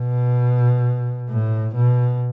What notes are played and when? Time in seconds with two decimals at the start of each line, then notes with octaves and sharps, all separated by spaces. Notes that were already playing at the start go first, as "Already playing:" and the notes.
Already playing: B2
1.30 A2
1.76 B2